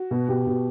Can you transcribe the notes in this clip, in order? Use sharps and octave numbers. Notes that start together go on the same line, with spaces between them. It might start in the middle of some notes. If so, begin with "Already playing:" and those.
Already playing: F#4
B2
B2 G4
B2